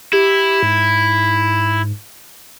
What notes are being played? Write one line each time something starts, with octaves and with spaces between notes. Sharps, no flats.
E4 G4
G#2